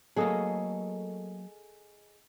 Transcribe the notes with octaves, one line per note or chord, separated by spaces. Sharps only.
F#3 A3 A#3 G#4 A4 D#5